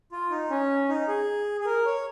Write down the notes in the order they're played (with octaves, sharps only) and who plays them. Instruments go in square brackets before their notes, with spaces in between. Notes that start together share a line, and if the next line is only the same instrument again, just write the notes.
[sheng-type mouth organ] F4
D#4
C#4
D#4
G#4
G#4
A#4
C#5